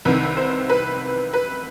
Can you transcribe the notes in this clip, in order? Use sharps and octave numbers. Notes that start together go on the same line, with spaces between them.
C2 C3 D#3 B4
C5
B4
B4